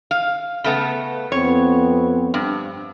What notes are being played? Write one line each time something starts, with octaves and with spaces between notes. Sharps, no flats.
F5
C#3 A3 B3
F2 B3 C4 C#5
G2